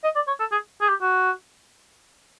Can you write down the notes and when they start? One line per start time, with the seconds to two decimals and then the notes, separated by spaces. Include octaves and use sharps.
0.04 D#5
0.15 D5
0.27 C#5
0.40 A4
0.52 G#4
0.81 G#4
0.89 G4
1.01 F#4